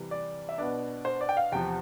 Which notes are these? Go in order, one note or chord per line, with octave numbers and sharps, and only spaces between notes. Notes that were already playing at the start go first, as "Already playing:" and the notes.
Already playing: C3 E3 G3
D5
E5
B2 B3 D4 D5
C5
D5
G5
F5
E2 C3 F3 G5